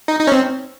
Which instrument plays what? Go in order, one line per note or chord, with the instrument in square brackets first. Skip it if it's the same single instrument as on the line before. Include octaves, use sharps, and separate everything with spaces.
[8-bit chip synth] D#4
D#4
C#4
C4